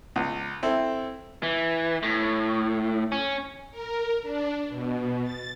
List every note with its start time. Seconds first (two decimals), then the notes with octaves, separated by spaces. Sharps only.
0.16 C#2
0.63 C4 E4 A4
1.43 E3
2.03 A2
3.12 C#4
3.71 A#4
4.23 D4
4.69 B2
5.24 A6